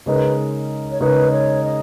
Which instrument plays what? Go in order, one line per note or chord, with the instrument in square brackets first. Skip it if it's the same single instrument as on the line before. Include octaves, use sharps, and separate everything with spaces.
[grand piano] C#3 G#3 D#4 A#4 [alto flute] B4
[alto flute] C#5
[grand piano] C#3 G#3 D#4 A#4 [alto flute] B4
[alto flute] C#5
D#5